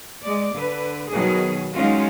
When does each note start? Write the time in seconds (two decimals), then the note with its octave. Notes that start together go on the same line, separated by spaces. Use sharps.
0.22 G#3 D5
0.54 D3 B4
1.09 B2 D#3 F#3 G#4
1.75 F#3 G#3 C#4 D#4 F4 F#4